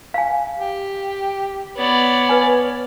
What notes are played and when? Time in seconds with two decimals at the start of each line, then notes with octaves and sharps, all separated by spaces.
0.14 F5 G#5
0.59 G4
1.76 B3 C#5 D5
2.29 B4 G#5